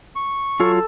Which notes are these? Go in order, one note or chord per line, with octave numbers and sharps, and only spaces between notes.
C#6
F#3 F4 A4 C#5